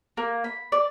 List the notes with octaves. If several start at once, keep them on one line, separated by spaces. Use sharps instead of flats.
A#3
B5
D5